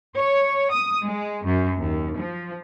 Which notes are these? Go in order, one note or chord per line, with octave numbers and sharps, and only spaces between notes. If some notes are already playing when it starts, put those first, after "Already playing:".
C#5
D#6
G#3
F#2
D#2
F3